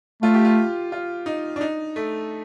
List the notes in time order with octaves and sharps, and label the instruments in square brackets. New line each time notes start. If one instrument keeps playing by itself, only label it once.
[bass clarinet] A3 [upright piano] F4
[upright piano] G4
F4
F4
D#4
D4
D#4
A3